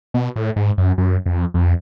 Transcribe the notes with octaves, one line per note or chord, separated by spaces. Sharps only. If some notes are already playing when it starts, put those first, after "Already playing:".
B2
A2
G#2
F#2
F#2
F2
F2